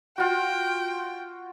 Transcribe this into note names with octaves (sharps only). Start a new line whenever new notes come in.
F4 F#4 G5